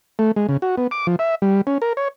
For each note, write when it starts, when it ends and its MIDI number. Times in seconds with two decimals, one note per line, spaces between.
0.19 0.32 57
0.36 0.47 56
0.49 0.57 49
0.62 0.76 66
0.78 0.87 59
0.91 1.07 86
1.07 1.16 53
1.19 1.35 76
1.42 1.61 55
1.67 1.78 61
1.82 1.93 70
1.97 2.08 73